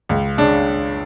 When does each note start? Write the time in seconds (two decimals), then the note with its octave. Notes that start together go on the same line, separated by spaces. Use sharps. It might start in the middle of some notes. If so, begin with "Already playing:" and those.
0.09 C#2
0.38 C#3 D4